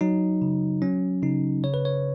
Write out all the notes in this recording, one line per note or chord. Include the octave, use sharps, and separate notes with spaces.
F#3 D#4
C#3
F#3 C#4
C#3 D#4
C#3 C#5
B4
C#5